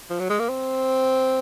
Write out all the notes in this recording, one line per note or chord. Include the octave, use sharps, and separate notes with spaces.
F3
F#3
G#3
A#3
C4